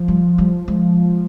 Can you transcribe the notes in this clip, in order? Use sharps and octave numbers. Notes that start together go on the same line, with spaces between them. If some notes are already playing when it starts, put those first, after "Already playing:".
Already playing: F3
G3
G3
G#3